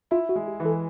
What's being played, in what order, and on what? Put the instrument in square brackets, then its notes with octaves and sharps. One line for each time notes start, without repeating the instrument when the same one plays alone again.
[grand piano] E4 [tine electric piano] F4
[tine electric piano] F#4
[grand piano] G#3
[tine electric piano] G4
[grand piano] E3
[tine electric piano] A4